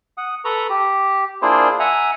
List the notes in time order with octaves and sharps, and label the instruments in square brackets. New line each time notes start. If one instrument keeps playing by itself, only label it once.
[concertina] F#5 D#6
A4 B4 A#5 C#6
G4
A#3 D4 E4 F4 G#4 C5
E5 F#5 G#5 A#5